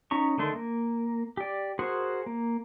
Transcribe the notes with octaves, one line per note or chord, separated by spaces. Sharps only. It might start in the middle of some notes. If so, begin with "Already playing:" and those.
C#4 D#4 A#5 C#6
D3 D#3 A3 D4 C6
A#3
G4 D5
F#4 G#4 A#4 C5 F#5
A#3